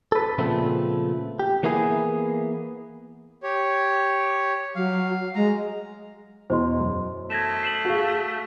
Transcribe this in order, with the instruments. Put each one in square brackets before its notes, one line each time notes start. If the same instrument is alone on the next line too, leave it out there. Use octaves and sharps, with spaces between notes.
[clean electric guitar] A4 B4
A#2 C#3 F3 A3 B3 C4
G4
E3 A#3 B3 E4 G#4
[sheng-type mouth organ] G4 C#5
[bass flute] F#3 [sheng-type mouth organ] F5
[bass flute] G#3 [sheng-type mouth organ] A#5
[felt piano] E2 B2 [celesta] C5 D#5 C6
[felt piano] F#2
[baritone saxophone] A3 [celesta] G#6 A#6 E7
[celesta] C7 E7 F#7
[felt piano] F#4 G#4 F5